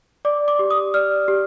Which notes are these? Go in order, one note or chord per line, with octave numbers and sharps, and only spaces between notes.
D5 D6
D6
G4
D#6
D5 F6
G4